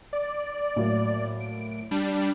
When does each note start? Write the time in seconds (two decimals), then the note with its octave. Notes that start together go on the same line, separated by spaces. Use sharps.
0.13 D5
0.76 A2 F#3 A#3
1.40 D7
1.91 G3 D4